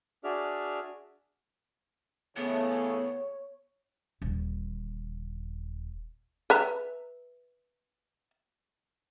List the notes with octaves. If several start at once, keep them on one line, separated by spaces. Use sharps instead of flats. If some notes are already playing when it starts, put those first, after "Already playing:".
D4 F#4 G#4 D5 E5 F6
C#3 E3 A3 B3 C#5
D#1 D3
B4 E5 A#5